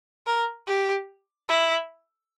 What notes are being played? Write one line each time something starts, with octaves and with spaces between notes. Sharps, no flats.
A#4
G4
E4